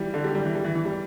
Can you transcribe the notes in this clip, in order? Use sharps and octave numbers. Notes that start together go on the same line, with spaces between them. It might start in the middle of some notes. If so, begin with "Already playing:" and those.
Already playing: E3 G3
D3
G3
G3
E3
G3
E3
E3
G3